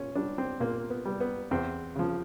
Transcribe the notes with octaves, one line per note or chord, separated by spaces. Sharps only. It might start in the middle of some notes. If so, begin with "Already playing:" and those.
Already playing: A#2 C#4
G3 D4
C4
A#2 A#3
B3
G3
B3
E2 C4
C#3 F3